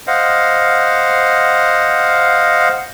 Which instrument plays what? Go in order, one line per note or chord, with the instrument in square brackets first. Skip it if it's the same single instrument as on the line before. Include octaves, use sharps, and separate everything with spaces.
[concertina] C5 D#5 F5 F#5